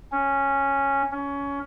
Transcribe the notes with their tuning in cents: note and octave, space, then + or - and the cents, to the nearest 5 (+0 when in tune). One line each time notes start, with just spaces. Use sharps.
C#4 -5
C#4 +20